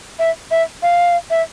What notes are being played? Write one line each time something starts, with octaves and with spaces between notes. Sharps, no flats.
E5
E5
F5
E5